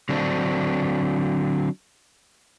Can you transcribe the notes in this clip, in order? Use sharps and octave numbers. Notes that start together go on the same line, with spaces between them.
D3 F#3 C4 D4